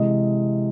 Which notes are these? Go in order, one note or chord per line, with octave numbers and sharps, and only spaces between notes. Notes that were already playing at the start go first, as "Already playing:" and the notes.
Already playing: C3 E3 G#3 D#5